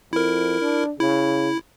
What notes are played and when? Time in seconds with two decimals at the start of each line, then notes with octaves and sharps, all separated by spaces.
0.13 F2 E4 A#4
0.62 D4
1.00 C#3 E4